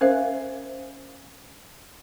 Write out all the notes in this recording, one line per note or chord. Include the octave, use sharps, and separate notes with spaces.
C#4 A#4 C5 E5 F5